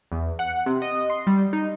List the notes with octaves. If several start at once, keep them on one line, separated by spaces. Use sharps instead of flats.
E2
F#5
C3
D#5
C6
G3
D#4